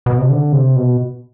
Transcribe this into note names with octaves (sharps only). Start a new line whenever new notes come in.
B2
C3
D3
C3
B2